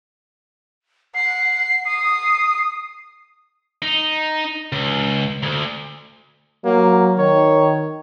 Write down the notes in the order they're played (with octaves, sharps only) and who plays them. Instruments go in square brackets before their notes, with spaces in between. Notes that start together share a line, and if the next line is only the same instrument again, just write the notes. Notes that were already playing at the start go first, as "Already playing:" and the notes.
[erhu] F#5 [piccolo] C7
[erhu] D#6 [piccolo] C7
[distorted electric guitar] D#4
C#2
D2
[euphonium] F#3 [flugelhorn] A#3
[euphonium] D#3 [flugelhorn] C#5